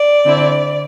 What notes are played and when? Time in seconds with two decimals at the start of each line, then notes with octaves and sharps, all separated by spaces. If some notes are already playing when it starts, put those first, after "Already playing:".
Already playing: D5
0.25 D3 C4 E4